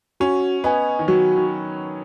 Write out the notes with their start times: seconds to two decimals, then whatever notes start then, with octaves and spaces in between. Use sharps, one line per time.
0.20 C#4 F#4
0.64 B3 D#5 G#5
0.99 D#3
1.08 F#3 F#4
1.37 D#3